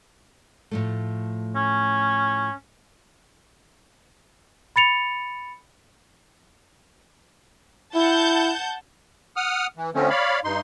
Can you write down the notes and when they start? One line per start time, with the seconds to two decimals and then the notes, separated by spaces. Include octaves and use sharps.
0.71 A2 F3 A3
1.56 C#4
4.76 B5 A6 C#7 F7
7.95 E4 F#5 A5 G6
9.36 F#5 D#6 F6
9.77 E3
9.95 D3 F3 A3 C4 C#4
10.10 C#5 D5 F5 B5
10.44 G2 D#4 C6